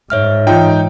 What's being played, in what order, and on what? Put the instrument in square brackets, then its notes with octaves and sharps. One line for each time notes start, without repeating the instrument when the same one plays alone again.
[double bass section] G#2 [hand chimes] C#5 E5 F6
[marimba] E3 F4 [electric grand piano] D#4 G5